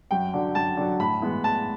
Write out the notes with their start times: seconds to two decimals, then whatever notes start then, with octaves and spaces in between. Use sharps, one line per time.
0.11 F#2 G5
0.33 D3 F#3
0.55 F#2 A5
0.77 D3 F#3
0.99 A2 B5
1.22 E3 G#3 B3
1.44 A2 A5